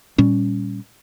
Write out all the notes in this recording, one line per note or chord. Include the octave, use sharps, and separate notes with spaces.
A#2 G3 C#4